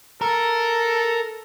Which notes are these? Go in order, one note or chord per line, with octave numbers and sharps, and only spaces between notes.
A4 A#4